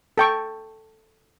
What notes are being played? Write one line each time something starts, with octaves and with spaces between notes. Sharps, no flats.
A4 G5 C#6